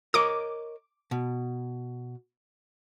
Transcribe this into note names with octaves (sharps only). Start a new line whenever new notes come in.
A#4 C#5 D#5 D6
B2